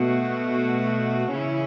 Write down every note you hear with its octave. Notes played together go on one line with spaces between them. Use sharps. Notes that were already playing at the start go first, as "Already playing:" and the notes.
Already playing: B2 A3 F#4
C#3 E3 C#4 E4